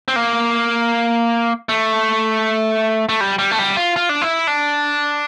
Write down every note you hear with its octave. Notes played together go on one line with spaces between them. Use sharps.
C4
A#3
A3
A3
G3
G3
A3
G3
F4
F4
D4
E4
D4